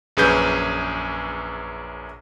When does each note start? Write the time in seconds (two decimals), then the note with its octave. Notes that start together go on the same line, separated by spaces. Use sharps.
0.17 A#1 F#2 G#4 B4 G6